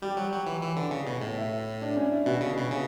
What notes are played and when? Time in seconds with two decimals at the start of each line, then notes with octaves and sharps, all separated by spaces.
0.02 G3 G4
0.17 F#3
0.32 F#3
0.46 E3
0.62 E3
0.77 D3
0.91 C#3
1.07 B2
1.21 A2
1.37 E4
1.82 D4
1.97 C#4
2.12 E4
2.26 B2 F#4
2.41 C#3
2.57 B2
2.71 C#3